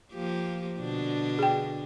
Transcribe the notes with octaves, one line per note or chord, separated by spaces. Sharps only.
F3 A#3 G4
B2 D3 D4
G#4 G5